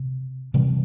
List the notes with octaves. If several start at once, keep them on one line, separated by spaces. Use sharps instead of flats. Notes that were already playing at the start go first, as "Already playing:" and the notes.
Already playing: C3
C3 E3 G3 C4